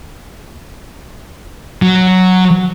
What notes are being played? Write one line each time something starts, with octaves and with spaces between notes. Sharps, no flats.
F#3